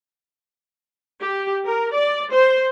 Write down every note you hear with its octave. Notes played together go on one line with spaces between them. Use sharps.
G4
A#4
D5
C5